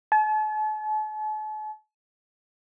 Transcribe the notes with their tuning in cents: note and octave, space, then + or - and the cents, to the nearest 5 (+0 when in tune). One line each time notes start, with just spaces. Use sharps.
A5 -45